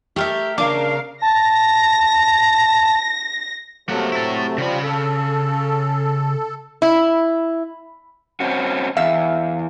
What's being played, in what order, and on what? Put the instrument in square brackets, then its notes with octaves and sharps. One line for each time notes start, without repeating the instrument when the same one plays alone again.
[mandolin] A3 A#4 E5 [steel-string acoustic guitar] G4
[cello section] C#3 A#4 F5 [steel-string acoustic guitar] A#3 D4 [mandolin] D6
[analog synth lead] A5 [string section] A#6
[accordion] C3 F#3 A3 [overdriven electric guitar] A#3 F#5
[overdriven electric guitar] E4 A4
[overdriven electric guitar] C#3 B5 [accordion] F3 G3
[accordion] A4
[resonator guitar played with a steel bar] E4
[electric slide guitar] C4 C#4 F#4
[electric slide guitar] E2 [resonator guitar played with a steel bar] E5 [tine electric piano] F5